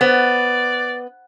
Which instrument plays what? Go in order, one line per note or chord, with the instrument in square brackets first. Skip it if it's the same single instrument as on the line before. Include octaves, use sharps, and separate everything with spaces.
[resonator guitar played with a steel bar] B3 [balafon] C5 F#5 [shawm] D5